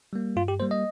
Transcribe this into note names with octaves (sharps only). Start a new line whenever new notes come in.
G3 A#3
G2 F4
G4
G3 A#3 C5
D#5